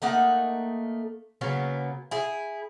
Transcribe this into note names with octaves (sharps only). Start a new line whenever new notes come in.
A3 A#3 D#4 F#5
C#3 F#3 A#3 B3
E4 G#4